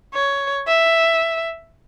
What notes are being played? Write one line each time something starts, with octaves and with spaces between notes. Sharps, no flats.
C#5
E5